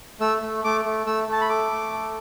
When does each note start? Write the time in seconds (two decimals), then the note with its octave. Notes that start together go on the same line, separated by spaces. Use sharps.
0.20 A3 E6
0.42 A3
0.64 A3 D6
0.85 A3
1.06 A3 E6
1.28 A3 A5
1.41 B5
1.49 A4 D6
1.71 A3
1.92 A4